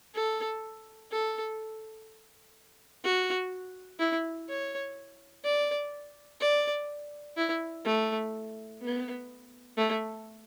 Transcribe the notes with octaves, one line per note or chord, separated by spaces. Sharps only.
A4
A4
F#4
E4
C#5
D5
D5
E4
A3
B3
A3